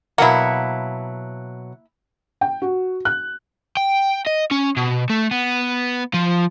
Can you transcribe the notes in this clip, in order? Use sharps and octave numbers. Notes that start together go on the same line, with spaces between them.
B2 F#3 A#3 E4 F#5
G5
F#4
F#6
G5
D#5
C#4
B2
A3
B3
F3